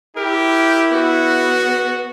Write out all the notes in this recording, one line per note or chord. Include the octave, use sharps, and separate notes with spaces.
E4 G4 A#4
B3 F#4